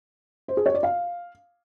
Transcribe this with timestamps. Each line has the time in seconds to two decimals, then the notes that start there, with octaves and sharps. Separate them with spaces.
0.48 C5
0.57 G#4
0.66 C#5
0.74 D5
0.83 F5